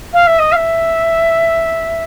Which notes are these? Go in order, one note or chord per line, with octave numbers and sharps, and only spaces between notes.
F5
E5
D#5
F5
E5